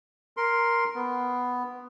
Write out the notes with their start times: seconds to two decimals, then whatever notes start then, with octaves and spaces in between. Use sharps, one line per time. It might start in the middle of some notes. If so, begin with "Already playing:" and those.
0.37 A#4 C6
0.95 B3